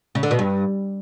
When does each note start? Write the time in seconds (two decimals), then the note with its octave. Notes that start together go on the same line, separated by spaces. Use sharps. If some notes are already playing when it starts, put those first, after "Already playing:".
0.15 C#3
0.23 D3
0.31 B2
0.39 G2